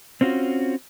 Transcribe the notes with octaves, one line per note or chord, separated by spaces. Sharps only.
C4 C#4 F4 F#4